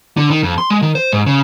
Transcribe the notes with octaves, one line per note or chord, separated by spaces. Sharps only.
D3
D#3
F2
C6
G#3
D#3
C5
G#2
C#3